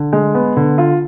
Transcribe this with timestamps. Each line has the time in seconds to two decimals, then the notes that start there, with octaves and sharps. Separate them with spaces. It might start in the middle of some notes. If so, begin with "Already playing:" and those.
Already playing: D3
0.13 G#3
0.35 B3
0.57 D3
0.78 F4